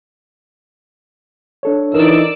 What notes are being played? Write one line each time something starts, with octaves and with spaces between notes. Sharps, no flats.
D4 A4 C#5
E3 D#4 A#4 D5 E6